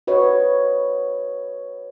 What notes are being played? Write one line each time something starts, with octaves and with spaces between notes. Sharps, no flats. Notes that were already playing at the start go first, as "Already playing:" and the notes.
F#4 B4 C#5 D#5